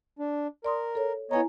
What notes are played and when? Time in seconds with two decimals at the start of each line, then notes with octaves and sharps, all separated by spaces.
0.19 D4
0.65 A#4 D5 C6 D#6
0.95 A4 C#5
1.31 B3 E4 C#5 D#5 G#5 A#5